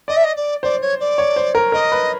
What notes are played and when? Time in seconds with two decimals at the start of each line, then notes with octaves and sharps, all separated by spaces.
0.08 D5 D#5
0.16 E5
0.24 D#5
0.36 D5
0.63 C5 D5
0.81 C#5
1.00 D5
1.18 C#5
1.36 C5
1.55 A#4
1.72 A#4 D#5
1.92 B4